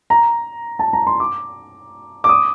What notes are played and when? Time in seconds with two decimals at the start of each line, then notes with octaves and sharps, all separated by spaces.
0.10 A#5
0.79 A5
0.93 A#5
1.07 C6
1.20 D6
2.24 D6
2.29 D#6